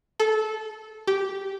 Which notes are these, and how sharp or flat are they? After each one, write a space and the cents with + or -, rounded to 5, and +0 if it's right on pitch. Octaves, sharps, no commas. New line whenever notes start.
A4 -20
G4 -10